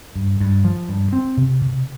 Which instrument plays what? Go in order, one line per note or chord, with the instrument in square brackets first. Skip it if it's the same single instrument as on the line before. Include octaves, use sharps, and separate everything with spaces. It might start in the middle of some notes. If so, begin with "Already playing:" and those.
[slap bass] G2
G2
F3
G2
C4
C3
C3